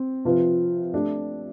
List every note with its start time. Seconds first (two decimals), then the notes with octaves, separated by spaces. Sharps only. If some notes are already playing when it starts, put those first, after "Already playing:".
Already playing: C4
0.25 C3 F3 C4 F4 B4
0.94 A3 D4 G4